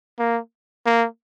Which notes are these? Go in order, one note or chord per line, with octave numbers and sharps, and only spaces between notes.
A#3
A#3